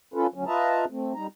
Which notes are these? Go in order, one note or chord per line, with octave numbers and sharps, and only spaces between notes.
C#4 F4 A4 B4
D2 F#3 C#4
F4 B4 D#5 E5 A5 A#5
A3 C4
G3 D#4 A#5